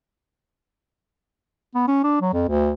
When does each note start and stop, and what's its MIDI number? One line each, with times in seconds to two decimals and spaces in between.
1.75 1.84 59
1.88 2.00 61
2.04 2.18 62
2.21 2.31 54
2.33 2.44 41
2.49 2.72 38